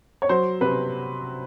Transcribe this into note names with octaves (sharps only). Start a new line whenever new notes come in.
C#5
F#3 C5
C3 B4